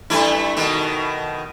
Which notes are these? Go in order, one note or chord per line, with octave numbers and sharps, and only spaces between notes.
G2 A3 E4
B2 D#3